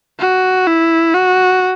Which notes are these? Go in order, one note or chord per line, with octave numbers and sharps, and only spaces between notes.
F#4
E4
F#4